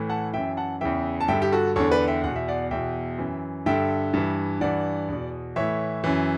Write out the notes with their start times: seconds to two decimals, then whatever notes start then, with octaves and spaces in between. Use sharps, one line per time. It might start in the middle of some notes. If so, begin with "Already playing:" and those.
Already playing: A2 E3
0.09 F#5 A5
0.34 F#2 E3 E5 G5
0.57 F#5 A5
0.81 E2 C#3 E3 E5 G5
1.21 A5
1.28 G2 D3 E5 G5
1.42 G4
1.52 F#4 A4
1.76 E2 D3 A4 C#5
1.92 B4 D5
2.08 E5 G5
2.24 E2 B2 F#5
2.36 E5
2.48 D5 F#5
2.71 E2 B2 E5 G5
3.18 F#2 E3
3.66 G2 D3 E5 G5
4.13 G2 E3
4.61 G2 E3 D5 F#5
5.09 E2 B2
5.56 A2 E3 C#5 E5
6.04 F#2 E3